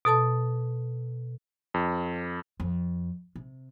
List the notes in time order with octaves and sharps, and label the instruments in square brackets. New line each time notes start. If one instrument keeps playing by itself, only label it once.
[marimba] B2 A4 A5 D#6
[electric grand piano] F2
[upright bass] F2
C3